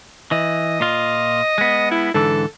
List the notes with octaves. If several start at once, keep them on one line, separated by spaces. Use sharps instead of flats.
E3 D#5
A#2 F4
G#3 B3
E4
G#2 D3 E3 A4